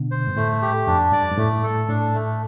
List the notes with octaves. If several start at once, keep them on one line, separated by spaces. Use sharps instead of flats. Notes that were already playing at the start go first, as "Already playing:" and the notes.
Already playing: B2 D3
C5
G2
A2 A3
G4
F2 D4
G2 D5
G2
A2 A3
A4
A2 D4
A3